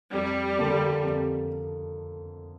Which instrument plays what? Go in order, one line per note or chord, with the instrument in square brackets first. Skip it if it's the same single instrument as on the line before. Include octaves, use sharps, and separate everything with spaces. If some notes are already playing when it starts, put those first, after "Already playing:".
[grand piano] F2 [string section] G3
[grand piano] D3 A#3 D4
F2